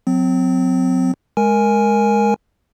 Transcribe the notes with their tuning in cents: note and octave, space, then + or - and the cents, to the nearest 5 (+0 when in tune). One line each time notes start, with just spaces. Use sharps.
F#3 -30 C4 -25
G#3 +10 A#4 +0 G#5 +0